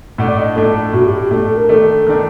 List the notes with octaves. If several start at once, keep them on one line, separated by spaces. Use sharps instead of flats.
A2 A3 D4 F#5
D5
D#5
A2 A3 D4 A4
A2 A3 D4 F#4
G4
G4
A2 A3 D4 A4
A4
A#4
D#3 A3 D4 A4
D#3 A3 D4